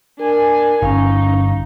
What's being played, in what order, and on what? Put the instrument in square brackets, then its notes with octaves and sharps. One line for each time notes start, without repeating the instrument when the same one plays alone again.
[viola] D4 G#5 [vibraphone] A#4
[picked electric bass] G1 [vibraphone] C#4 F5 [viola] D#4